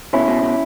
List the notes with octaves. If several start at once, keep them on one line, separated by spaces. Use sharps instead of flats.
B2 C#4 E4
B2
B2